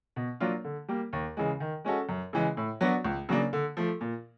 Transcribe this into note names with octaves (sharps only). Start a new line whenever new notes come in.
B2
F#3 A#3 D4 F4
D3
G3 A#3
D#2
C#3 E3 G#3
D#3
G#3 C#4 F#4 A4
F#2
C#3 E3 G#3
A2
F#3 B3 D4 F#4
C#2
C#3 F#3 A#3 D4
D3
F3 A3
A#2